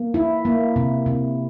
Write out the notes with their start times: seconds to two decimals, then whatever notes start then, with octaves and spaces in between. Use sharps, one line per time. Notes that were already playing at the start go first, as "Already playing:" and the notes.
Already playing: A#3
0.14 E4
0.45 A#3
0.76 C3
1.06 C3